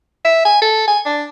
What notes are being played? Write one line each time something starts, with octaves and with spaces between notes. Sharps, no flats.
E5
G#5
A4
G#5
D4